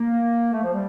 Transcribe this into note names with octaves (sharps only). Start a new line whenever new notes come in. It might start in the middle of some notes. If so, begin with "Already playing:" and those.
Already playing: A#3
A3
F3
G3